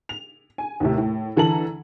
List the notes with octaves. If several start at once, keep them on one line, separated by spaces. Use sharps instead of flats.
F7
G#5
D#2 A2 C3
A2
D3 E3 A4 A#5 F#7